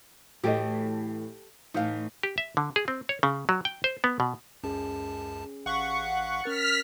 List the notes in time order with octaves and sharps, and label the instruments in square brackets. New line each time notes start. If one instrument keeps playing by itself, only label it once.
[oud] A2 E3 F#4 [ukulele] G4 A4 D#5
[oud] A2 E3 [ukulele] D#4 F5
[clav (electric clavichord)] G4
E5
D3
G#4
C4
C#5
C#3
F#3
G5
C5
B3
B2
[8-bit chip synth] C#2 F#2 A5 [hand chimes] C#4 G#4
[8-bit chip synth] A1 F5 B6 [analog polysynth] F#5 C#6
[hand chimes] C#4 A#4 A6 [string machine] F6 B6